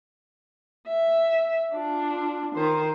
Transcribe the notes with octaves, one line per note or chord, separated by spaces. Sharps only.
E5
D4 F4
D#3 C5